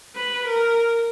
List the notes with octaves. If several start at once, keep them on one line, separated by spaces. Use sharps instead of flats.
B4
A#4